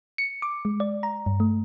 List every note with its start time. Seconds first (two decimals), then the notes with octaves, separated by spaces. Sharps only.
0.18 C#7
0.42 D6
0.65 G#3
0.80 D5
1.03 A#5
1.26 G2
1.40 A3